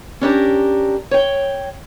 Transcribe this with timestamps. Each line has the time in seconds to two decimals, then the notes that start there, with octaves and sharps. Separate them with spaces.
0.21 C#4 D4 G4 A#4
1.11 C#5 G5